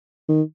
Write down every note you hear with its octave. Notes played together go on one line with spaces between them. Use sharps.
D#3